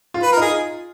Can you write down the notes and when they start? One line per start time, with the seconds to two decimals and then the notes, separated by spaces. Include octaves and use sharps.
0.14 F4
0.22 B4
0.32 A#4
0.37 D#4 G#4